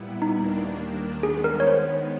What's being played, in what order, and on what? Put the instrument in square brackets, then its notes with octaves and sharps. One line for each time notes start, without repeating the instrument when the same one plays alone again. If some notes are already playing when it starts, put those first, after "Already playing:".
Already playing: [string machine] A#2 G3 B3 E4
[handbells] D#4
[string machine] D#2 D#3 G3 A#3 D4
[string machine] D#3 G#3 B3 [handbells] G#4
[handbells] A#4
C#5
C5